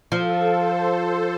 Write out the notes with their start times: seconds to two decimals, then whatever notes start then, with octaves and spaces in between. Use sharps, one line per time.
0.12 F3 A4
0.49 C5
0.86 C5